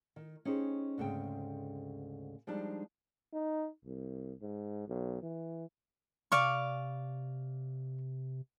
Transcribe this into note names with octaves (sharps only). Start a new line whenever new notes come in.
D#3
C#4 D#4 G4 G#4 C5
D2 G#2 C#3 C4 G5
F3 G3 G#3 D4 D#4
D#4
C2
G#2
B1
E3
C3 D5 F5 C#6